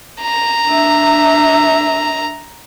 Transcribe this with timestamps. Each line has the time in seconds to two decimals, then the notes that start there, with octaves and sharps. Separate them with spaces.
0.22 A#5
0.67 D4 E5